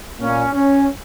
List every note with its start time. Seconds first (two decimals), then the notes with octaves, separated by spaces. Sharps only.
0.20 A#2 A#3 C#4
0.53 C#4